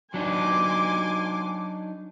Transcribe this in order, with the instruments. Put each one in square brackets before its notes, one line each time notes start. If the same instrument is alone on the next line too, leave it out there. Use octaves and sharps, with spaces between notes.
[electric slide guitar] F#3 D4 D#4 [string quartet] G#5 C6 D6